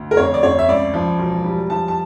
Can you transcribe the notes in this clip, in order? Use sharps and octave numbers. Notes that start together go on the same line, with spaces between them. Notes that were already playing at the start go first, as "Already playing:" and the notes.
Already playing: D2
A#4
F2 C#5
D5
F2 C#5
E5
C#2 D5
F3
E1
G3
F3 A5
A5